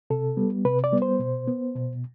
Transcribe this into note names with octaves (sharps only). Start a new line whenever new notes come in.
C3 A4
G3 B3
C3 B4
D5
G3 B3
C5
B2
B3
B2